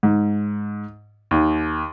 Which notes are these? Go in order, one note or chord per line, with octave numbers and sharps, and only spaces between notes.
G#2
D#2